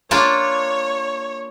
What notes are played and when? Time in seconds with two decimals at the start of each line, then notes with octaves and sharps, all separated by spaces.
0.11 A#3 D4 F4 C#5